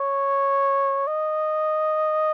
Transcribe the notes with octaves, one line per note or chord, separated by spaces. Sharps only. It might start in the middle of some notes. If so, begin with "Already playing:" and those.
Already playing: C#5
D#5